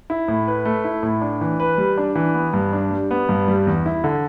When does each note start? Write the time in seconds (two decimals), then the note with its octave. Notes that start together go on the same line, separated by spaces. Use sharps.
0.10 E4
0.28 A2
0.48 B4
0.65 A3
0.84 E4
1.03 A2
1.22 D4
1.41 E3
1.60 B4
1.78 G3
1.98 D4
2.15 E3
2.34 B3
2.53 G2
2.73 D4
2.91 G3
3.11 B3
3.29 G2
3.48 G3
3.67 E2
3.86 E4
4.04 D3